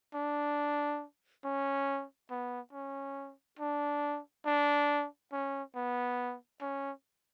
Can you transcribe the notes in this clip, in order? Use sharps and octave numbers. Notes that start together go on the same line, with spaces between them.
D4
C#4
B3
C#4
D4
D4
C#4
B3
C#4